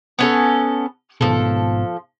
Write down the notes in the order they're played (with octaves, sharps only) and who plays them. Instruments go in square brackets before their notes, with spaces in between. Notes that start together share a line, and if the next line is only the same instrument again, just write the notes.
[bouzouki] B3 C#4 A4
[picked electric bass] G#1 G#2 B2 [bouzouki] F3 A4